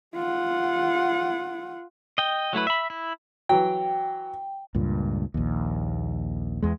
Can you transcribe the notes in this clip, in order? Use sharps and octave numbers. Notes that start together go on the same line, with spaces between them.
F4 F#5
D#5 G5
F#3 A3 E4 B4
E5 B5
E4
E3 F#3 G5
C#2 G2 A#2
A#1 D#2
E2 G#3